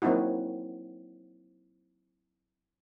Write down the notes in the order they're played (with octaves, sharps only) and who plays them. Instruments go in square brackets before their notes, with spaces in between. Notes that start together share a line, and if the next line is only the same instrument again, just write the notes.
[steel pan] F#3 A#3 C4 D#4 E4 F#4